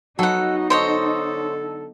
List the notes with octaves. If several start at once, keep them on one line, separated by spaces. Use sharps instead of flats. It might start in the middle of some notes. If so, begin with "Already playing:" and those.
F#3 B3 D#4 F#4 A4 F#5
D3 A4 C5 C#5 D#5